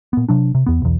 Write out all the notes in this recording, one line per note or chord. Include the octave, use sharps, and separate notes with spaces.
A#2 B3
C3 F#3 D4
C3
E2 B3
B1 E2